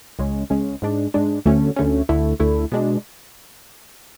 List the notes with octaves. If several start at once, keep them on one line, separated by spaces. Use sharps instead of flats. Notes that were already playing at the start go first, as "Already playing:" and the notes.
C#2 C#3 G#3 C#4
C#2 C#3 G#3 C#4
G#2 G#3 D4
G#2 G#3 D4
D2 D3 A3 C#4
D2 D3 A3 C#4
D2 D3 A3 E4
D2 D3 A3 E4
B2 G#3 D4